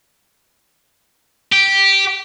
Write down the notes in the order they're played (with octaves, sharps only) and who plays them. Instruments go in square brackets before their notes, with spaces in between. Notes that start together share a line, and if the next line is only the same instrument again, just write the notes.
[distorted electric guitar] G4